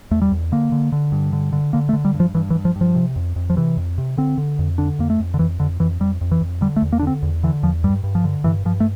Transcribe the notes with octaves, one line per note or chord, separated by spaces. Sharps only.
E2 A3
G3
E2
D3 A#3
D3
D3
G2
D3
D3
D3 A#3
A3
D3
G3
G2
F3
G2 E3
E3
G2
F3
G2
F3
C3
F2
F2
F3
C3 E3
F2
C3
D3 C4
D3
F2
D3 D4
F2 A#3
A3
F2
D3
F2 E3
F2 D3
F2 E3
F2 G3
F2
E3
F2
D3 G3
A3
E2
A#3
D4
D3 C4
E2
D3 E3
E2 F3
G2 G3
G2
F3
D3
G2 E3
G2 F3
A3